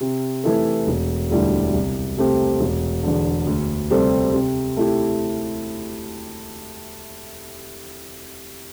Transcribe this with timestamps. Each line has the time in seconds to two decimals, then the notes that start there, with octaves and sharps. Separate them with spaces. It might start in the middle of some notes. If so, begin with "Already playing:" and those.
0.01 C3
0.44 E3 A3 E4 A4
0.87 E1
1.30 D2 D3 G3 E4
1.74 C2
2.18 C3 A3 C4 G4
2.60 E1
3.03 E2 D3
3.47 D2
3.90 C3 G3 C4 A4
4.33 C3
4.77 A3 E4 G4